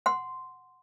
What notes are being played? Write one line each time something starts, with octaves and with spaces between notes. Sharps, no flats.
F#5 C6